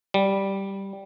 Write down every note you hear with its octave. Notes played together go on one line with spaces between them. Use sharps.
G3